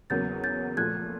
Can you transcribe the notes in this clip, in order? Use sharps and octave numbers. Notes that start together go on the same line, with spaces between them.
E2 C#3 F#3 A#3 G6 A6
G6 A6
A#2 F3 A3 F#6 G#6